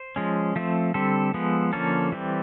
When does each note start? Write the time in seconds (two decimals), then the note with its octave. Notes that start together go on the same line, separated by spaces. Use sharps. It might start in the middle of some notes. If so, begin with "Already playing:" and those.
Already playing: C5
0.16 F3 G#3 C#4
0.56 F3 A3 C4
0.94 D3 G3 C4 A4
1.34 F3 G#3 B3
1.73 D3 F3 A#3 C#4 A4
2.12 E3 G3 C4